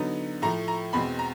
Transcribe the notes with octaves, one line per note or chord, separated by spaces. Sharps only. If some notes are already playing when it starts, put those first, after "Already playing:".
Already playing: D3 F#3 B3 D#4
A2 F3 A3 A#5
A#5
E2 B2 G#3 C4 B5
A#5